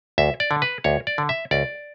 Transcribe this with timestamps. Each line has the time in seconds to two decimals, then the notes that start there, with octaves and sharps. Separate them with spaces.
0.18 D2 E5
0.40 D5
0.51 D3
0.62 B4
0.84 D2 C#5
1.07 D5
1.18 D3
1.29 E5
1.51 C#2 D5